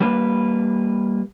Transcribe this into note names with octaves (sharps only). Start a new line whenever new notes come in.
G3 A#3 B4